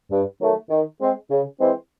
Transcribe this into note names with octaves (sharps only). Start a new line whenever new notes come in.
G2
D#3 F#3 A3
D#3
G#3 C4
C#3
E3 G#3 C4